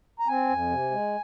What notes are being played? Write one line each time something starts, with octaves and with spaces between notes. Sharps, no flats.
A#5
C4 G#5
F2
C3
G#3